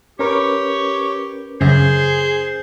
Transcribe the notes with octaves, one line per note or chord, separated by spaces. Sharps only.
C#4 G4 A#4 B4 C#5
F#2 C#3 G#4 C5